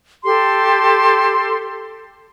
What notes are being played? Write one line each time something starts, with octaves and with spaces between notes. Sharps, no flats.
G4 A4 C6